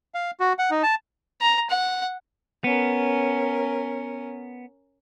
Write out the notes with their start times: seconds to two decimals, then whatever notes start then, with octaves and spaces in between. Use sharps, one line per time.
0.14 F5
0.40 F#4
0.59 F#5
0.71 D#4
0.83 A5
1.41 A#5
1.70 F#5
2.64 B3 C#4 A#4